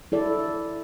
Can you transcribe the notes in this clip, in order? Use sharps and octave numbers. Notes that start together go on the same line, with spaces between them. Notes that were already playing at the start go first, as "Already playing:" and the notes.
E4 A4 D5